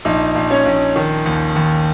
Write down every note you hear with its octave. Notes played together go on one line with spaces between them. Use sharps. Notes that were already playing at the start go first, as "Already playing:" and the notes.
A#1 D#4
A#1
C#4 C#5
A#1
D#3
D#2
D#2